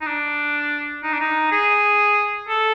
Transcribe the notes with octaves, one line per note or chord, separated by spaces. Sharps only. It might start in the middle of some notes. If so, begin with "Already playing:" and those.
D#4
D4
D#4
D4
D#4
G#4
A4